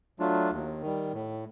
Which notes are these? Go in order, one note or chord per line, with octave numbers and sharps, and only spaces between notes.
F#3 A3 D4 F4
D#2
D#3 G3
A2